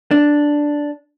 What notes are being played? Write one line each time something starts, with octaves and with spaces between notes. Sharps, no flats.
D4